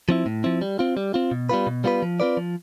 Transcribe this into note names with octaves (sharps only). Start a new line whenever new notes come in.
F3 C4 E4
A2
F3 C4 E4
G3
C4 F4
G3
C4 F4
B2
G3 B3 F4 B4
B2
G3 B3 F4 B4
F3
C4 F4 B4 D5
F3